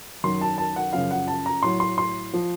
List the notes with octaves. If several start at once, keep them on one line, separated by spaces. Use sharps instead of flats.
F#2 D#3 F#3 C6
A5
A5
F#5
F#2 C#3 F3 F5
F#5
A5
A#5
A2 F#3 C6
C6
C6
F3